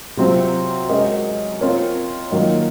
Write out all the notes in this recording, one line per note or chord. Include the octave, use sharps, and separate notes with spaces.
C3 F#3 C4 F4 C5
G#3 C#4 F#4 A#4 D#5
C4 F4 A#4 C#5
D#3 F#3 A#3 F4